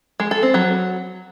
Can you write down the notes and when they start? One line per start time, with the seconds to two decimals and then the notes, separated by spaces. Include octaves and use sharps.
0.20 G#3
0.31 A4
0.43 C4
0.54 F#3